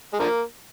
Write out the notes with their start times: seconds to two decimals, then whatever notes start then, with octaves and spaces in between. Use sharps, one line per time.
0.13 G#3
0.19 D3 F3 A#3